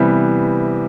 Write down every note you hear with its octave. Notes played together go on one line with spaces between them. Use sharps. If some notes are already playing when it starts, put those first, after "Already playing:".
Already playing: C3 E3 G3 B3